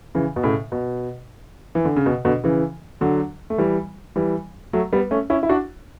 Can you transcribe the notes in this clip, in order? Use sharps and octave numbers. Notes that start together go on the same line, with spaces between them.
C#3 E3
B2
A2 C#3
B2
E3
D3
C#3
B2
B2 D3
C#3 E3
D3 F#3
A3
E3 G3
E3 G3
F#3 A3
G3 B3
A3 C#4
C#4 E4
E4
D4 F#4